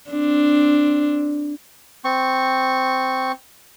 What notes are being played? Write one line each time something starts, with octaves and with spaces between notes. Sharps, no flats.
C4 D4
C4 C#6